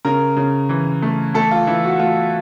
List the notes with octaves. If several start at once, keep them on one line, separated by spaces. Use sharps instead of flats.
C#3 A#4
C#3
E3
A3
A3 A4
F4
E3 E4
F#4
A3 F4